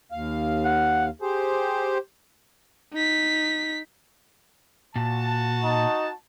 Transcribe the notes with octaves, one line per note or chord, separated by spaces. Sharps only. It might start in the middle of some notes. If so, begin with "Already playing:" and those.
D#2 F5
F#5
G4 G#4 C5
D#4 B6
A#2 F#4 A5
D#4